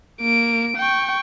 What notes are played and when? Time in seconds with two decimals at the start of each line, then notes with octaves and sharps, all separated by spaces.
0.21 A#3 D7
0.78 G5 C#6